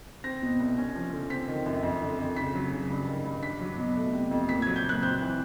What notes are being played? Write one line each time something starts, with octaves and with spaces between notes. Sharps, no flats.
C4 A#6
B2
C2
C#4
F3
D3
C4 B6
D#3
F#2
F2
D3
F2
C#3 B6
F#3
C#3
G2
D#3
G2
D4 B6
F#3
B2
A3
C3
F2
A#2 B6
G#6
F#3
G6
A#2 F#6
C4 G6
E3